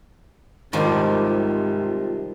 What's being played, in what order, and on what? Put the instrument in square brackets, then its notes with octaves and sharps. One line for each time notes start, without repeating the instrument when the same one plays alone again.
[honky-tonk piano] G#1 C5 [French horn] C3 [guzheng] D#3 F3 G3 [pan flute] F4